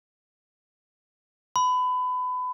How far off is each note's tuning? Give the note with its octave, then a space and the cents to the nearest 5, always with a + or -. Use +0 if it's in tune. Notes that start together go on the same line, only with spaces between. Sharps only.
B5 +25